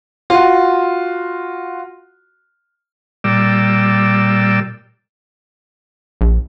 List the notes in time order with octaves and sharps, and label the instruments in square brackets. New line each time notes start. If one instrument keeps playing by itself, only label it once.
[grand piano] F4 F#4
[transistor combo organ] A#2 G3 D5 E6
[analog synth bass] A#1